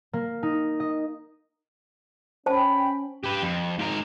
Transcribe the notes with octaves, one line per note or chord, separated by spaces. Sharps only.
A#3
D#4
D#5
C#4 C5 G5 A5 B5
G4 B4
F2
G#2 A#4